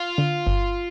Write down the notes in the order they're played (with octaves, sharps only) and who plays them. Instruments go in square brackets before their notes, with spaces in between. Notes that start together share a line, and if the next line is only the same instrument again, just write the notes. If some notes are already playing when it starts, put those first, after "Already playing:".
Already playing: [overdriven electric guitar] F4
[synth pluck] D3
G1